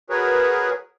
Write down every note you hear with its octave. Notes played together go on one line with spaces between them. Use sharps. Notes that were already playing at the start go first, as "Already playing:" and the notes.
F#4 G#4 A#4 B4 C#5